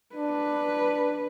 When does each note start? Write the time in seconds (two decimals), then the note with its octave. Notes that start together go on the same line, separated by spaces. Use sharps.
0.15 D4 B4